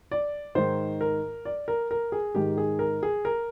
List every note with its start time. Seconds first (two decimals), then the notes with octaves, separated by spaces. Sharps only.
0.12 D5
0.55 G#2 D#3 C5
1.01 A#4
1.45 D5
1.68 A#4
1.91 A#4
2.12 G#4
2.35 G#2 D#3 G4
2.57 G#4
2.79 A#4
3.03 G#4
3.25 A#4